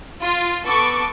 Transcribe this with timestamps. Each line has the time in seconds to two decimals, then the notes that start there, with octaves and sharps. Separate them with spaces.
0.20 F4
0.64 B3 A4 C#6 D6